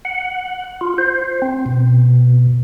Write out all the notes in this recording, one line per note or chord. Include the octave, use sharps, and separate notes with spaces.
F#5
F4
C5
C4
B2